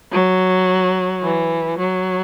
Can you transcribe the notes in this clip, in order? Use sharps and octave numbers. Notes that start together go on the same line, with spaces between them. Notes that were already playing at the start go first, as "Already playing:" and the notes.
F#3
E3
F#3